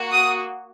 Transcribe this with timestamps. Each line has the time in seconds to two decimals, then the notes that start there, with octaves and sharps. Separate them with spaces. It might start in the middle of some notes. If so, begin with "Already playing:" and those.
Already playing: A#3 F#4
0.13 D#6